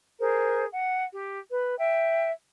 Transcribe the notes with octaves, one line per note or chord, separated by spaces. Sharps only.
G#4 A#4 C5
F#5
G4
B4
E5 G5